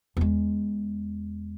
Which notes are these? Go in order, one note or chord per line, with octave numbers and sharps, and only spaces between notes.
E2 G#3